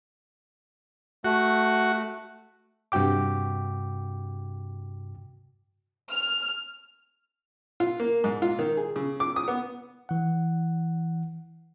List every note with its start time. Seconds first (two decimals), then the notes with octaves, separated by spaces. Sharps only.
1.24 A3 F#4
2.92 G2 C3 F#4 G5 D6
6.12 F6
7.80 F4
8.00 A#3
8.24 G#2
8.42 F4
8.59 D#3
8.77 G#4
8.96 C#3
9.20 D6
9.36 D#6
9.48 B3
10.09 E3 F#5